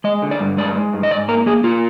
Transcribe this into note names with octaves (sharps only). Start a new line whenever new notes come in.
G#3 D#5
D3
D5
G2
G#3 D5
G#3
G2
D#5
G#2 D5
A#3 A#4
A#3 G#4
A#3 F4